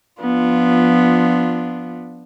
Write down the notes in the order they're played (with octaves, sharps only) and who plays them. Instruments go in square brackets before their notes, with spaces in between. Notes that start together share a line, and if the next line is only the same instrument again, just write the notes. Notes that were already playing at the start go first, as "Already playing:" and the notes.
[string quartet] F3 B3 D4 F4